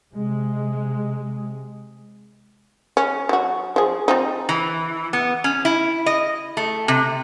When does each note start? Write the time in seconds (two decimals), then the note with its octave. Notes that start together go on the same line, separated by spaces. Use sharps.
0.14 C3 G#3
2.97 C#4
3.29 F#3 F#4
3.76 F3 G#4
4.08 F3 C4 D#4
4.49 E3
5.13 B3
5.44 C#4
5.65 E4
6.06 D#5
6.57 A3
6.88 C3